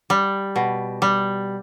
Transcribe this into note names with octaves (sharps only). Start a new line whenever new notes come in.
G3
B2
G3